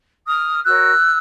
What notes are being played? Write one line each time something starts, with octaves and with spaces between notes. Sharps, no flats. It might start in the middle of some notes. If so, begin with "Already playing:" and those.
D#6 F6
F#4 A#4 C#5 E6 F#6